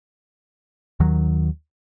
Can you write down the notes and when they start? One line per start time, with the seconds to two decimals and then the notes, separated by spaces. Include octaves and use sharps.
1.00 D#2 D#3 F#3